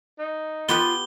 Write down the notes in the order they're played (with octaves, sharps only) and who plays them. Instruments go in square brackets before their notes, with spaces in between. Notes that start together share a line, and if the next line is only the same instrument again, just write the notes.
[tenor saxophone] D#4
[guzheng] B3 G4 B4 [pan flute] F4 [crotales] G7